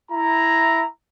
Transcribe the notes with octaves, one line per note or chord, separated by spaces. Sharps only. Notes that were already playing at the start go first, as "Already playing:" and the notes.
E4 A#5